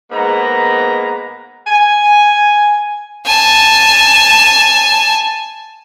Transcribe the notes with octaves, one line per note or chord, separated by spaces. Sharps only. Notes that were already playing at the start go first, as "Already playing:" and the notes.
G#2 G#3 A#3 B3 A#5
G#5
G#5 A5